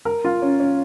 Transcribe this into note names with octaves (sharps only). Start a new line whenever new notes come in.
A#4
F4
C#4
C#4